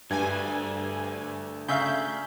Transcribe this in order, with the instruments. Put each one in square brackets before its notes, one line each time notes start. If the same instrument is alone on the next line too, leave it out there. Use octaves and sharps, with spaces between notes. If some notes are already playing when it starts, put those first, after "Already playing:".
[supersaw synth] G2 G#5 [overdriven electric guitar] A3 D4 [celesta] G#6
[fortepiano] C#3 E5 F5 [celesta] G#5 A#5 [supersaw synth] G6